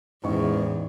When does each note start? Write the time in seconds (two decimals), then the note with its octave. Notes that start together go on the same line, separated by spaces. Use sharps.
0.24 A1 E2 G#2 C#6